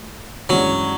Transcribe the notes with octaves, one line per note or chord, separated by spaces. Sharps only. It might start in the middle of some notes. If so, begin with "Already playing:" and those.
Already playing: A2
G2 E3 F#3 G#3 C#4